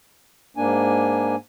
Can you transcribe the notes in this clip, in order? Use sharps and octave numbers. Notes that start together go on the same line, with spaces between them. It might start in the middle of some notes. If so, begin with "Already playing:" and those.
G#2 A#3 D4 G#5